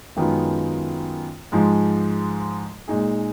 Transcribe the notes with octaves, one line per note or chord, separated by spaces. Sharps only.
F#2 D#3 G#3 B3 F4
G#2 F3 G#3
A#2 G#3 D#4 G#4